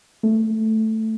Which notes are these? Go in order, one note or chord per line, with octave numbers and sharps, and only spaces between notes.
A3